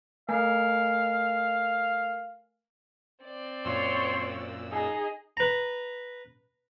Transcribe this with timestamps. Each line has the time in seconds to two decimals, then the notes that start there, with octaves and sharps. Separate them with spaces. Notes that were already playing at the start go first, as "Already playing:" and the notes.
0.29 A3 A#4 F5 G#5
3.23 C4 D5
3.65 F#2 A#2 C#5 C6 E6
4.71 D#4 G#4 D#5
5.37 B4 A#5